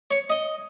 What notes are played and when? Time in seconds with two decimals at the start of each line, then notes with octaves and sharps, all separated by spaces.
0.11 C#5
0.30 D#5